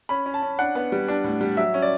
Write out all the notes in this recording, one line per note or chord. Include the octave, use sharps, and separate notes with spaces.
C#4 B5
C#4
A5
C#4
D4 F#5
B3
G3
D4
A2
G3
F#3 E5
C#4
D5